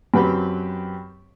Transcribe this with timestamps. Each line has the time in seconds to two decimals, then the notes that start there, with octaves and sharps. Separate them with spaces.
0.14 F#2 C4 G4 B4 G5